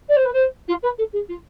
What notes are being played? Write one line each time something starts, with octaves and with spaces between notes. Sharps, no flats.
D5
C5
B4
C5
F4
B4
A4
G#4
F4